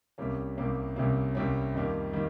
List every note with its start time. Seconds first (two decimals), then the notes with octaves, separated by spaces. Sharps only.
0.18 C2 C3 G3 A#3 C#4
0.57 C2 C3 G3 A#3 C#4
0.96 C2 C3 G3 A#3 C#4
1.35 C2 C3 G3 A#3 C#4
1.75 F2 D#3 G3 A#3
2.13 D#3 G3 A#3